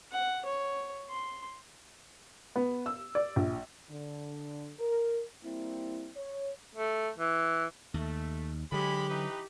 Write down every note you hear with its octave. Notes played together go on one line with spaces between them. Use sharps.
F#5
C#5
C6
B3
E6
D5
A#1
D3
A#4
G3 A#3 C4 E4
C#5
A3
E3
D#2 A3
D3 F#3 G#3 G4 B5
E3 D#4 B4